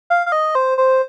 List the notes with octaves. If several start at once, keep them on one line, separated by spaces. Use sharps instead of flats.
F5
F5
D#5
C5
C5